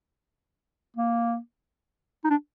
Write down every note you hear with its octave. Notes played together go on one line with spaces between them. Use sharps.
A#3
D#4
D4